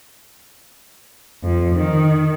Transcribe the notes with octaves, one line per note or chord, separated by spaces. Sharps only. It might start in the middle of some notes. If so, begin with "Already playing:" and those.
F2
D#3